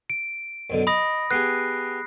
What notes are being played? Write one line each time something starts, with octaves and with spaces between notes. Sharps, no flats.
D7
F#2 B2 D3
D#5 B5 D#6 A#6
B3 G4 G#4 F#6 C7